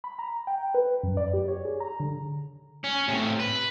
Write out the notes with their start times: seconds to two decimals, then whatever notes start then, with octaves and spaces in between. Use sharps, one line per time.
0.04 B5
0.19 A#5
0.47 G5
0.74 B4
1.03 F#2
1.17 D5
1.34 G4
1.48 C#5
1.65 G#4
1.80 A#5
2.00 D3
2.84 C#4
3.08 A2 C3
3.40 B4